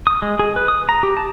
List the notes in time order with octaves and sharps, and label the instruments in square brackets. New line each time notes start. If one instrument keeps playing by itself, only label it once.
[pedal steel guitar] D#6
G#3
G#4
B4
D#6
A#5
G4
A5